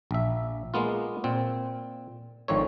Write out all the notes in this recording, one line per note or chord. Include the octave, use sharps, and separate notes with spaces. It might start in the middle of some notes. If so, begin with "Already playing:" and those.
A#1 E5
G#3 A#3 B3 F4
A#2 C4
G#1 D#3 F3 D4 A4 C#5